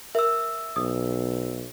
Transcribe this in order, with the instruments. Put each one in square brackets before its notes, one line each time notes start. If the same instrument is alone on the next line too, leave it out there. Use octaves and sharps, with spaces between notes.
[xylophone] A#4 [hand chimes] E5 E6
[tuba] B1 [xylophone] D#6